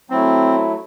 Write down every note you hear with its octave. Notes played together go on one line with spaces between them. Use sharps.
F#3 A3 C4 E4